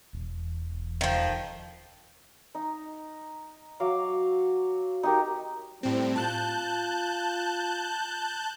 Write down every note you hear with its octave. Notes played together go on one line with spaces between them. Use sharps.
E1
D#3 F3
D#4
F#3 F5 D6
D#4 G4 A#4
A2 G3 C4
F4 A5 F#6 G6